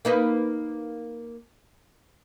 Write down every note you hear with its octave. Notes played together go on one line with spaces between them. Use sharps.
A#3 D#4 B4